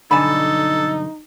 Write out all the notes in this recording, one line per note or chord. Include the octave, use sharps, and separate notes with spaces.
B1 G2 D3 D#4 A4 G#5 A5 B5